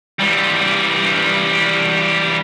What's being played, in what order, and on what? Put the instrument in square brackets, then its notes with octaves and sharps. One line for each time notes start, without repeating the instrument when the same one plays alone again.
[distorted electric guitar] E3 G3